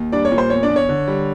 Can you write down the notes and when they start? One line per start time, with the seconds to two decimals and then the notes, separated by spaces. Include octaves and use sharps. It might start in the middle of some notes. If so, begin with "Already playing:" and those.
Already playing: D#2
0.12 G3 D4 D5
0.25 C#5
0.32 A#2
0.38 C5
0.50 E2 C#5
0.63 D4 D5
0.69 E2
0.76 C#5
0.89 D3
1.08 G3